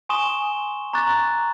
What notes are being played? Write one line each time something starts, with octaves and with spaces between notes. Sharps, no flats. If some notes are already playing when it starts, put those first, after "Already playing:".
G#5 C6 C#6 D#6 E7 G7
A#5 C#6 D6 F#6 A6